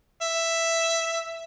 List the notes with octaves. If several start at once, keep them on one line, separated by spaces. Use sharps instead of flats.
E5